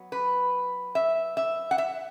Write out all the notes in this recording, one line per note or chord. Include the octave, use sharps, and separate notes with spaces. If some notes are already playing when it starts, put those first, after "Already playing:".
Already playing: F#3 B3
B4
E5
E5
F#5
E5